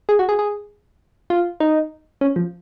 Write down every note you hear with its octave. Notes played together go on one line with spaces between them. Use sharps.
G#4
F#4
G#4
G#4
F4
D#4
C#4
F3